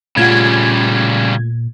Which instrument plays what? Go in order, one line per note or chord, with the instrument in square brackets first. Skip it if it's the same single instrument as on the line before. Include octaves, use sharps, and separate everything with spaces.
[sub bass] A#2 [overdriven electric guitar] C#3 G3 [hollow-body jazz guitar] A3 F4 F#5 [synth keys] G#6